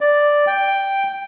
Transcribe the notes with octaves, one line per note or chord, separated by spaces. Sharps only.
D5
G5